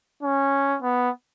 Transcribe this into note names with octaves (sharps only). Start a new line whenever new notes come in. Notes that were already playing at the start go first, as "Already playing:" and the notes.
C#4
B3